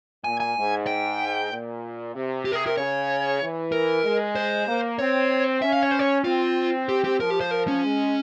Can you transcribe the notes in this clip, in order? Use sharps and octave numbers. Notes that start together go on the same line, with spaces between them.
A#2 G#5
G#5
G#2
G5
A#2
C3
G4
A#4
G#4
A#4
C#3 C#5
E3
A#4
G#3
C5
A#3
C4 C#5
C#4 E5
F5
C#5
C5
C#5
C4 F4
G4
G4
F3 A#4
G4
C5
A#4
C#4
G#3